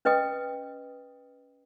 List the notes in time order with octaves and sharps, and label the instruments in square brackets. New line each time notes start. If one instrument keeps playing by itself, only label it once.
[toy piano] C#4 B4 D#5 G5 D#6